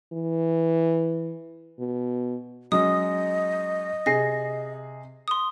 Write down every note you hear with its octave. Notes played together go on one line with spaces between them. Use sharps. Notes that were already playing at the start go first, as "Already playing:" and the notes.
E3
B2
F#3 G#3 C#4 D#5 D#6
C3 G#4 A#6 C7
C6 D#6